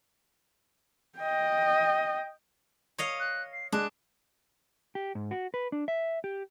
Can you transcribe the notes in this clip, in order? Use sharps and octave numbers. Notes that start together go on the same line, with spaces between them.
D#5 G5
C#5 D#5 F5
F#6
C7
G#3 D4 F#6
G4
G#2
F#4
B4
D4
E5
G4